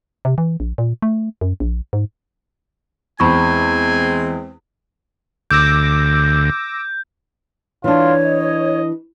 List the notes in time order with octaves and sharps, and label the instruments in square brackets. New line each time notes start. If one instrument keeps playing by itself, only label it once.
[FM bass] C3
E3
A#1
A#2
A3
F#2
A#1
G#2
[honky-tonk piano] E2 [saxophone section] G#3 C4 [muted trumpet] G#5 [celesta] B5 C#6
[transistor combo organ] D2 [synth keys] D6 E6 A#6 [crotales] G6
[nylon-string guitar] E3 D4 [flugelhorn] F4 [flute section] C#5
[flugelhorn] D#5